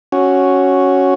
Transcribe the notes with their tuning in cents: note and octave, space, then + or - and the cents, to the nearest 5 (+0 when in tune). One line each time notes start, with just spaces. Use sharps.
C#4 +0 F#4 +0